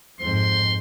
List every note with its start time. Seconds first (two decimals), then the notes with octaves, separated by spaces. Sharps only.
0.20 F2 G#2 C5 C6